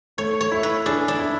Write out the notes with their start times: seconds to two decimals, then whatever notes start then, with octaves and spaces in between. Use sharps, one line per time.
0.18 A3 C#5
0.41 C#5
0.52 E4
0.63 B4
0.86 D4 G#4
1.08 D4
1.19 E4